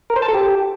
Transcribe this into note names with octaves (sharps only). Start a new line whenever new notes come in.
A#4
C5
A5
A4
G4